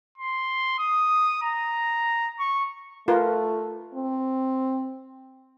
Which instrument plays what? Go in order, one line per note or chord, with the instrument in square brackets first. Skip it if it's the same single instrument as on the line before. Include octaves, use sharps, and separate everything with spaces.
[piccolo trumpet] C6
D#6
A#5
C#6
[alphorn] A3 [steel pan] F4 A#4 B4
[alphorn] C4